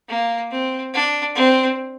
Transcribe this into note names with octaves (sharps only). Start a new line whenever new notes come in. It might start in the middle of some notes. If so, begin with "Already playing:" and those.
A#3
C4
D4
C4